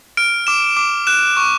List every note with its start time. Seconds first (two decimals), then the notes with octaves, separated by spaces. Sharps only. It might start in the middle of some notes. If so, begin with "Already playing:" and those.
0.17 F6 D7
0.47 D6 E7
0.77 D6
1.07 F#6 E7
1.37 C#6